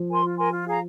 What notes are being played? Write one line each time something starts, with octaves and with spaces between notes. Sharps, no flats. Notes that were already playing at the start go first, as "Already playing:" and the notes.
Already playing: F3
A#4 G#5 C6
F4
A#4 G#5 C6
F4
G#4 F5 A#5